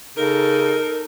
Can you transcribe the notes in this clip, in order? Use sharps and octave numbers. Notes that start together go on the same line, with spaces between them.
C#3 D#4 A4 A#4